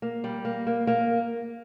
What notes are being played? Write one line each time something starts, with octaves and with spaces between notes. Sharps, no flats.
A#3
G3
A#3
A#3
A#3